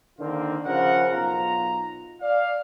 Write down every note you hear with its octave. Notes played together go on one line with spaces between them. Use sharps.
D3 D#3 A#3 C4 F4
C#3 F3 A#4 F#5
B1 F4 A#5
D5 F5